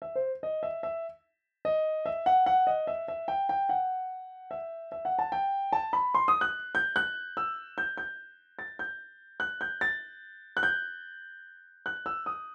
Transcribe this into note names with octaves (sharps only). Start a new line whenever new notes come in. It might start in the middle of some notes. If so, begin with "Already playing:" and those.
E5
C5
D#5
E5
E5
D#5
E5
F#5
F#5
D#5
E5
E5
G5
G5
F#5
E5
E5
F#5
A5
G5
A5
B5
C6
D#6
F#6
G6
F#6
E6
G6
G6
A6
G6
F#6
G6
A6
F#6
G6
F#6
E6
D#6